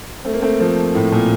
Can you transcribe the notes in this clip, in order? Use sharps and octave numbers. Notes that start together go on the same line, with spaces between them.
A3 C4
A#3
A3 C4
F3 A3
A2
A#2